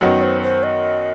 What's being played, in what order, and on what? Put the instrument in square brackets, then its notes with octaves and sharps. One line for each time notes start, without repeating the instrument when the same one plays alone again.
[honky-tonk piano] F#2 D#3 F#3 B3 F#4 [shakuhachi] D#5
[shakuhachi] C5
C5
D#5